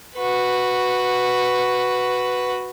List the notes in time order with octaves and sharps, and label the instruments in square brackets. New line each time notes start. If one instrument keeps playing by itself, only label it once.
[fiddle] F#4 B4